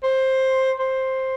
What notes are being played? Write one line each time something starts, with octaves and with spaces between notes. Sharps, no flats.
C5
C5